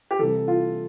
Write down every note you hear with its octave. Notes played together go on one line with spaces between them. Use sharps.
G4
C2 C3 E3 A4
F4